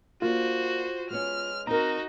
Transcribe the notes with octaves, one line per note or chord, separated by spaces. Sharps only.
A#3 D4 F4 F#4 C5
G#3 B3 C#4 F6
C4 D#4 F#4 A#4 A#5